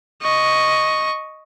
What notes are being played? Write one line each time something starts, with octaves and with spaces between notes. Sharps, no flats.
D#5 C#6